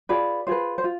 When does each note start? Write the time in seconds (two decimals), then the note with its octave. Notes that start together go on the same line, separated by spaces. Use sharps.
0.09 F4 G#4 B4 D5
0.47 F4 G#4 B4 C5
0.78 C5
0.84 F4